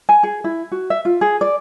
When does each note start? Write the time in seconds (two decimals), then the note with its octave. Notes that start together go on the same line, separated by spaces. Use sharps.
0.09 G#5
0.23 G#4
0.44 E4
0.72 F#4
0.90 E5
1.05 F4
1.21 G#4
1.41 D5